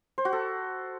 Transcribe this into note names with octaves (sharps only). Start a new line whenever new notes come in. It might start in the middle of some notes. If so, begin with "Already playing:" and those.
C5
F#4
A4